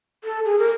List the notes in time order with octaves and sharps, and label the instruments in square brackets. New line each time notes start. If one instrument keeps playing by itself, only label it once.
[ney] A4
G#4
A#4